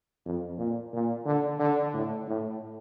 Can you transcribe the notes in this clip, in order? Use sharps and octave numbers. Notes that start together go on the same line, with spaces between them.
F2
A#2
A#2
D3
D3
A2
A2